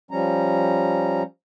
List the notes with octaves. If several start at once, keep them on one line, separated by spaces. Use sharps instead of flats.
F3 G3 C#4 A#5